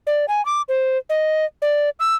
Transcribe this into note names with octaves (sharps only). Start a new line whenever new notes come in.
D5
G#5
D6
C5
D#5
D5
E6